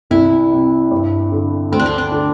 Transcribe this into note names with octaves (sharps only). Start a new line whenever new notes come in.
C2 E4
C3
G2
D3
D2 C4
D4
C4
D4
D3